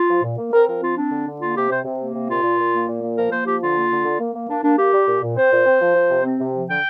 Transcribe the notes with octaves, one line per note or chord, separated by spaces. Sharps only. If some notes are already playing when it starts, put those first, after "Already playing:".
Already playing: F4
F3
A#2
A#3
C4 A#4
F3 A#4
C4 F4
C4 D4
D3
D3
A#3 F4
C3 G4
C3 C5
C3
A#3
C3
A#2 F4
A#2
A#2
A#3
A#2
A#3
F3 A#4
A#3 C5
F3 G4
D3 F4
A#3
D3
D3
A#3
A#3
A#3 D4
A#3 D4
A#3 G4
G3
A#2
A#2
C4 C5
A#2
C4
F3
F3
C3
C4
C3
F3
D3 G5